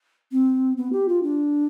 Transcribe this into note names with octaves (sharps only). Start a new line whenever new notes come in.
C4
B3
G4
F4
D4